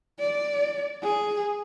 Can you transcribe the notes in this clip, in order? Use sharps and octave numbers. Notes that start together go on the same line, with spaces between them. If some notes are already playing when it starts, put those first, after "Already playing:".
D5
G#4